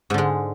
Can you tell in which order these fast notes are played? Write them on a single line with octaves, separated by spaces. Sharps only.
G#2 D3 G#3